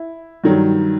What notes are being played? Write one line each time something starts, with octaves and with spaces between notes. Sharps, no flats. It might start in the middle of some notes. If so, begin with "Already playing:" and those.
Already playing: E4
G2 D#3 F#3